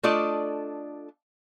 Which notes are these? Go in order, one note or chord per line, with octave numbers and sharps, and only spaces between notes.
A3 D4 F4 A4 D5 D#5